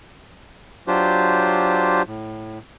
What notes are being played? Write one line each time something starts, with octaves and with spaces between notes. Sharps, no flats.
F#3 D4 F4 G4 C5
A2